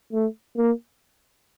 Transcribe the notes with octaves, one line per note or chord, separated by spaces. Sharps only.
A3
A#3